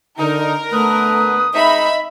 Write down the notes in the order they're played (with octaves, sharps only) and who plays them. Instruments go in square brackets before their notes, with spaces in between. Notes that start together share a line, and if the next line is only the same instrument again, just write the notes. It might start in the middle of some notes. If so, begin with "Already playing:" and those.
[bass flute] D3 [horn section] D#4 [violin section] A#4
[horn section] D3 B3 B4 [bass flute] A3 [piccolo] D#6
[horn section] G#3 C4 D#4 [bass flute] D#5 [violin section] E5 B5